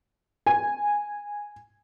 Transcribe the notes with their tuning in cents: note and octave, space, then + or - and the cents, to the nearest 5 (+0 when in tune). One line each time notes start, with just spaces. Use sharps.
G#5 -10